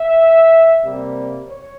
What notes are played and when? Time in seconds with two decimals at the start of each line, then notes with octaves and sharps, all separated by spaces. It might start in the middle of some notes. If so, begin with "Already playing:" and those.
Already playing: E5
0.84 C3 G3 A#3
1.49 C#5